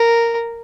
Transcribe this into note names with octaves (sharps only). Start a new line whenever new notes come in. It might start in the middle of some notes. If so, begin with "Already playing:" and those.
Already playing: A#4